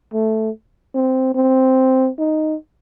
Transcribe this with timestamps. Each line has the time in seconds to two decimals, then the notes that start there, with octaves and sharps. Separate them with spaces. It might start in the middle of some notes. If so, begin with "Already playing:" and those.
0.13 A3
0.95 C4
1.35 C4
2.19 D#4